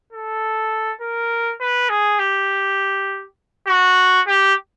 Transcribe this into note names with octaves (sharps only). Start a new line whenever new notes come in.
A4
A#4
B4
G#4
G4
F#4
G4